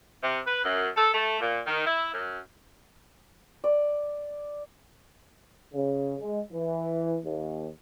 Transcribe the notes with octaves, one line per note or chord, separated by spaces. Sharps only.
C3
B4
F#2
A4
A3
A#2
D#3
E4
F#2
D5
C#3
G#3
E3
D#2